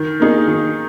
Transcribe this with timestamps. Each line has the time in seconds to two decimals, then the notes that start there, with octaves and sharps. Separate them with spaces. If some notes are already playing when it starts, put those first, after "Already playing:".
Already playing: D#3
0.20 A#3 D#4 G#4
0.48 D#3